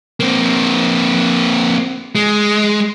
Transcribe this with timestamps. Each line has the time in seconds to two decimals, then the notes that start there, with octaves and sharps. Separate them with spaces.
0.20 A#3 C4
2.15 G#3